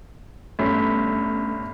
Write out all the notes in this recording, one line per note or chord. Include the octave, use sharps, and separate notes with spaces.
G1 G2 A3 C#4 B6